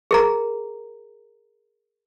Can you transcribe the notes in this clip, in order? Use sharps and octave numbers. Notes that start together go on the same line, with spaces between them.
G#4 A#4 A#5